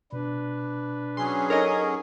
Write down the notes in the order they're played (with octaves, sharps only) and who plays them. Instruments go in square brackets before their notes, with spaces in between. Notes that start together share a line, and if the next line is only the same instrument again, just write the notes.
[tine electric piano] B2 [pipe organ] D4 B4
[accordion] F#3 C#4 G#4 [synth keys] C6
[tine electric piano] D#4 A4 [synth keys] A#4 C#5 D#5